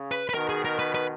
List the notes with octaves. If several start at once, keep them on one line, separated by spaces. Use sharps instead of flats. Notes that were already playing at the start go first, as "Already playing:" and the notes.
Already playing: C#3
B4
B4
B2 D#3 A#4
G#4
A#4
B4
B4